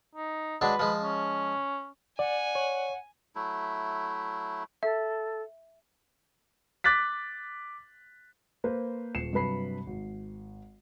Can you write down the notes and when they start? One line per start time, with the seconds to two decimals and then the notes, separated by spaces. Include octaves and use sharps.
0.15 D#4
0.61 F#3 G#3 D4 B4
0.79 F3 G#3
1.02 C#4
2.19 D5 F#5 G#5
2.55 C#5
3.36 F#3 A3 E4
4.83 A4 E5
6.84 D6 F#6 A6 B6
8.64 A#3 B4 C5
9.15 D#1 C7 C#7 E7
9.33 G2 C3 F#3 B4 B5 C7
9.87 G#1